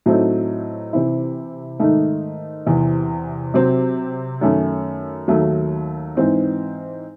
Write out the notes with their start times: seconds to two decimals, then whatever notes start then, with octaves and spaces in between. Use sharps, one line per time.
0.06 A2 F#3 A3 C4 D#4
0.93 C3 E3 C4 E4
1.79 G#2 D#3 A3 D#4
2.66 E2 C3 E3
3.54 C3 F#3 C4
4.41 F#2 D#3 A3 C#4
5.28 D#2 D#3 F#3 A3
6.15 G#2 E3 C4 D#4